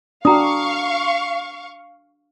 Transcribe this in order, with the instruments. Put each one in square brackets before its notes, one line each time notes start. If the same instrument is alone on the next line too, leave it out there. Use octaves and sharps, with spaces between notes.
[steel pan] D4 F#4 [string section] F5 C#6 [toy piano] G5 A#5 D#6